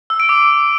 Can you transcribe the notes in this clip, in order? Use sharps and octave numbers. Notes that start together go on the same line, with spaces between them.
E6
D7
D6